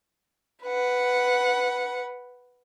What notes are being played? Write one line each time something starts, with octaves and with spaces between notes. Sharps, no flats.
B4 F#5